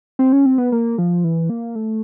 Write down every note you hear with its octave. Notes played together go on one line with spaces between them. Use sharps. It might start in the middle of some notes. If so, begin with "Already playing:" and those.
C4
C#4
C4
B3
A#3
F3
E3
A#3
A3